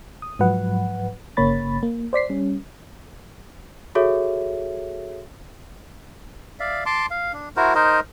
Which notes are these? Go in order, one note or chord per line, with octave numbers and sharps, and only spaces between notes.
D#6
G#2 F3 F#3 B4 F#5
G1 C#3 A#3 C#5 B5 A6
A#3
C5 D5 B6 C7
G3 C#4
F#4 G#4 A4 C#5 E5
D5 E5 F5
A5 C6 D6
F5
D4
E4 F#4 A#4 C5
D#4 A#4 C5 D#5